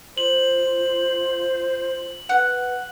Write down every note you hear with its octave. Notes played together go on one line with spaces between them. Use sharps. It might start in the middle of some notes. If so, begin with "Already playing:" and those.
F4 C5 F#7
B4 F#5